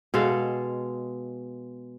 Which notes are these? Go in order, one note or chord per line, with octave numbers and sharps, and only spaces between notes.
B2 G#3 A4 F5